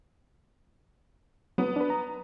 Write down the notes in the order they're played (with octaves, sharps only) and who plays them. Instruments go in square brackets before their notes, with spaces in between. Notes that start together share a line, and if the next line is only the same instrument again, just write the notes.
[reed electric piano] F#3 [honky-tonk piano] B3
[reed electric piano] D4 B4
A#5